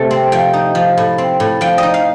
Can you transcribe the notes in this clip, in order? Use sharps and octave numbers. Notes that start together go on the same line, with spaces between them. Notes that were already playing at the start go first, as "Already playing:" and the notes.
Already playing: C3 A3
C4
F3 G5
D#4
F3
A2
C4
A2
F3 G5
D#5
D#4
F5